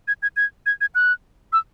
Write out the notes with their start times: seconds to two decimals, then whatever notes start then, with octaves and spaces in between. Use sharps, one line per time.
0.08 G#6
0.22 G#6
0.36 G#6
0.66 G#6
0.81 G#6
0.95 F#6
1.53 E6